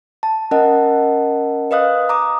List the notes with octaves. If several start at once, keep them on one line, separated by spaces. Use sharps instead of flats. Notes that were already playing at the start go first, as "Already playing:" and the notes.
A5
C#4 A#4 D#5 F#5 A5
B4 D#5 F5 D#6 F#6
A#5 D6 D#6